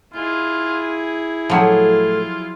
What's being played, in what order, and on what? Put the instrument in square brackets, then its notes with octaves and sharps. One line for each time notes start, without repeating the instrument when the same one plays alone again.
[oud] D#2 [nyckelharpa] E4 G#4 [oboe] F4
[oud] A2 A3 [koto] F3 F#3 [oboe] F4